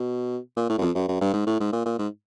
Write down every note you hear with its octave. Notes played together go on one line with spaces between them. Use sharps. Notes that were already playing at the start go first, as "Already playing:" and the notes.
Already playing: B2
A#2
A2
F#2
F2
F#2
F#2
G2
G#2
A2
G#2
A#2
A#2
G#2